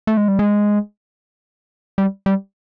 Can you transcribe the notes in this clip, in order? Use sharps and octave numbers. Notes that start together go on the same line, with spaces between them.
A3
G#3
G3
G#3
G3
G3